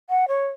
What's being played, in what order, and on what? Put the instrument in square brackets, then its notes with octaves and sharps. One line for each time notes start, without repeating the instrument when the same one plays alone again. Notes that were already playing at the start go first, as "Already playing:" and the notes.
[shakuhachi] F#5
C#5